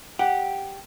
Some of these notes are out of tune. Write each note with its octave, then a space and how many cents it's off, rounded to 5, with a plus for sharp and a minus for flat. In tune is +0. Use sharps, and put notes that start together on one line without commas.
G4 +0 F#5 +0